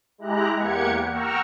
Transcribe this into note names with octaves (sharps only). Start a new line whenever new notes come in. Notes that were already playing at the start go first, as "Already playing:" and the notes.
G#3 E4 G4 A#5 F#6
E2 A#3 G4 F#5 G#6 C#7
F#5 G5 A#5 C#6 E6 F6